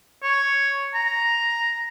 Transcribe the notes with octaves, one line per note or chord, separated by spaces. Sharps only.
C#5
A#5